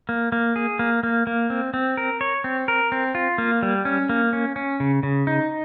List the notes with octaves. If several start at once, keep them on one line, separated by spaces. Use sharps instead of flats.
A#3
A#3
G#4
A#3
A#3
A#3
C4
C4
A#4
C#5
C4
A#4
C4
F4
A#3
G3
C#4
A#3
C#4
C#4
C#3
C#3
D#4